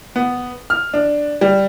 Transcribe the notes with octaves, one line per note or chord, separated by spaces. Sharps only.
B3
F6
D4
G3